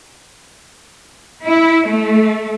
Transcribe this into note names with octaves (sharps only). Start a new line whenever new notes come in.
E4
A3